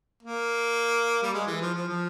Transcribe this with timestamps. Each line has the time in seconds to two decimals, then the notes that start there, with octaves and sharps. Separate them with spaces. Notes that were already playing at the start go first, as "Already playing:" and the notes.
0.23 A#3
1.22 G3
1.34 G#3
1.47 E3
1.61 F3
1.75 F3
1.88 F3